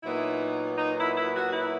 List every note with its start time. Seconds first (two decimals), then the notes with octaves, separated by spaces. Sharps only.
0.03 A#2 F#3 B3 D#4 E4
0.78 D#4
0.97 E4
1.15 E4
1.34 F#4
1.53 E4